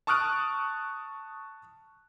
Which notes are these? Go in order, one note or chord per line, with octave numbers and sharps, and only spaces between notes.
A5 C#6 D#6 F6 F#6 D7